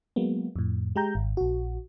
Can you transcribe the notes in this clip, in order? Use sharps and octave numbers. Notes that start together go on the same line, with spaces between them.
F#3 G#3 A#3 B3
F2 A2
G#3 G4 G5 A#5 G6
G#1
A#1 F#4